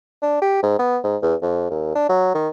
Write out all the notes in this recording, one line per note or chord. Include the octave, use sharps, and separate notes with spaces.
D4
G4
G#2
B3
G#2
E2
F2
D#2
D4
F#3
D#3